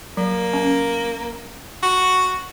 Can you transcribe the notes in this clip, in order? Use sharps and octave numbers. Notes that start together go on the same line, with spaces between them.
F#3 A#3
C#4
F#4